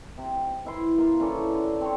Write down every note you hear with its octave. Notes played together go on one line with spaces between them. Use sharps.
C3
E3 E4 C6
A#3 F4
E3 C#4 A4 D5
D3
C4 D4 C#5